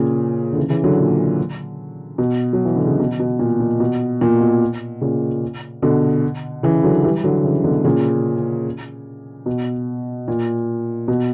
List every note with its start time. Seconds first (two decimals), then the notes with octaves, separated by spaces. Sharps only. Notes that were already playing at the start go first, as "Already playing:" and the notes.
Already playing: A#2 C#3
0.53 D3
0.57 C#3 E3
0.70 C#3 E3
0.84 D3 F#3
0.97 A#2
2.18 B2
2.53 F#3
2.65 E3
2.76 D3
2.87 C#3
3.00 B2
3.20 B2
3.39 A#2
3.60 A#2
3.80 B2
4.21 A#2
4.40 B2
5.01 A#2 C#3
5.82 B2 D3
6.63 C#3 E3
6.83 D3 F#3
7.04 E3 G3
7.24 D3 F#3
7.44 C#3 E3
7.64 B2 D3
7.85 A#2 C#3
9.46 B2
10.28 A#2
11.08 B2